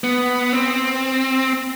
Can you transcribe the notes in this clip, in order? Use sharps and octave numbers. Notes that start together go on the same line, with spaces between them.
B3
C4